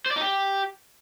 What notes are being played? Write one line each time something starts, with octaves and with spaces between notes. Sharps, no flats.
C5
D5
D#4
G4